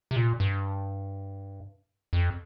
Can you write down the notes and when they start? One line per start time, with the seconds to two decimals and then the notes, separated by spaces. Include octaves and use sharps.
0.11 C3
0.16 A#2
0.40 G2
2.13 F2